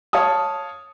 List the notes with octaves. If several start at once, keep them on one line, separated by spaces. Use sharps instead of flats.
C#5 F5 A5 D#6